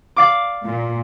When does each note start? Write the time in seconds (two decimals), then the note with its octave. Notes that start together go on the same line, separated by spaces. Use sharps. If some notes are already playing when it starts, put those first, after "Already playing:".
0.16 D5 F5 D6
0.65 A#2